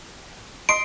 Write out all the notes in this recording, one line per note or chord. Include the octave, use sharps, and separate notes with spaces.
D#5 C6 C7 D7